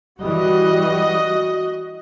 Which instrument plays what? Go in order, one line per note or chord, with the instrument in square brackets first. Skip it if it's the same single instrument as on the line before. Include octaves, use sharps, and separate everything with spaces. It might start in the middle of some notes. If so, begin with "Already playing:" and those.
[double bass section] E3 G3 [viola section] F#4 D#5